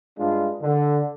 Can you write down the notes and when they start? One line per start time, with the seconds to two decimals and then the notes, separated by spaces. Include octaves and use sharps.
0.18 G2 G#3 D4 F4
0.61 D3